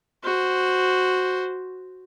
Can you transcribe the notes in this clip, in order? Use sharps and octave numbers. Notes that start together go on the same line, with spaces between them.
F#4 C5